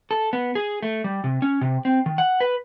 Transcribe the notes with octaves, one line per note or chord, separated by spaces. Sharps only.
A4
B3
G#4
A3
G3
C3
C#4
C3
C4
D#3
F#5
B4